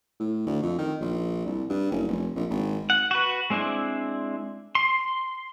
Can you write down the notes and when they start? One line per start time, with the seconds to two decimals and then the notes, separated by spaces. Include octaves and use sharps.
0.20 A2
0.46 D2
0.62 F2
0.78 D#3
1.01 A#1
1.46 C2
1.69 G2
1.91 F#1
2.08 F1
2.36 A#1
2.50 G#1
2.90 F#5
3.11 F#4 B4
3.50 G#3 C4 D4 E4
4.75 C6